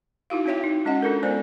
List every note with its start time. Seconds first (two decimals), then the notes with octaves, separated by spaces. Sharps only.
0.30 D#4 E4 F#4 F5
0.46 C4 F#4 C#5 E5 G5
0.64 D#4
0.85 G#3 C#4 D#5 F#5
1.02 D4 F4 A4 A#4
1.23 G#3 B3 C5 D5